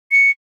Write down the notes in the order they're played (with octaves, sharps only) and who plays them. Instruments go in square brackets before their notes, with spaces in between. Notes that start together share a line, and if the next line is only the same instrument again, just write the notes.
[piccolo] C#7